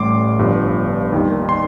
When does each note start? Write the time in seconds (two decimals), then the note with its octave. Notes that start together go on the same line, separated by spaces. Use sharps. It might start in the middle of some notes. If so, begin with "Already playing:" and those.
Already playing: A1 A2 G3 C6 D6
0.39 G1 G2 F3
1.12 D#2 D#3 G3
1.49 C6